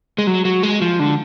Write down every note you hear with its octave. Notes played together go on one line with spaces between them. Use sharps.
G#3
F#3
F#3
G#3
F3
D3